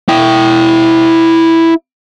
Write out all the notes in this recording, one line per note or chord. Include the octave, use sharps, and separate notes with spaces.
E4 G5